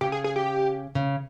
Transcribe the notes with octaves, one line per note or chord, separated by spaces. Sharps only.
C#3 G4
G#4
G#4
G4
C#3